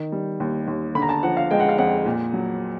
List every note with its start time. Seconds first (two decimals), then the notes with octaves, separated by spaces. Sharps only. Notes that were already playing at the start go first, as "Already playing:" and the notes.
Already playing: D#3
0.12 G3
0.40 D#2
0.68 D#2
0.95 D3 B5
1.02 A#5
1.09 A5
1.23 F3 F#5
1.37 F5
1.51 G#3 G5
1.60 F#5
1.69 F5
1.78 F2 F#5
2.06 A#2
2.34 F#3